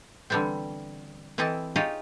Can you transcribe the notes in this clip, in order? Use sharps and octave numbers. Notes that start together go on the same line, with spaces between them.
D3 E3 G3 B3 C4
E3 C4 E4 A4 D#5 A5
D#4 F4 G4 G#4 C#5 D#5